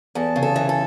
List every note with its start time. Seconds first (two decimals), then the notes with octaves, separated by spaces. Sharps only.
0.15 E2 A4
0.36 C#3
0.43 A4
0.56 E3
0.69 A4